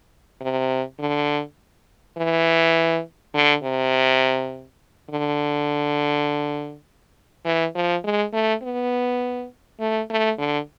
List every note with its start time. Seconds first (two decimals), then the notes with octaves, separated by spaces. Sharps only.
0.41 C3
1.00 D3
2.17 E3
3.34 D3
3.64 C3
5.10 D3
7.45 E3
7.75 F3
8.04 G#3
8.33 A3
8.62 B3
9.80 A3
10.10 A3
10.38 D3